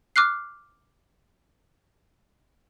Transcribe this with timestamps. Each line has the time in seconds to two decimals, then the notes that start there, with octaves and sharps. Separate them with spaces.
0.16 D6 F6 F#6 C7